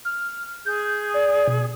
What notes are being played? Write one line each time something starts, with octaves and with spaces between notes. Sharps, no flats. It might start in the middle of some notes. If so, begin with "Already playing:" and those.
F6
G#4 G6
D5
B2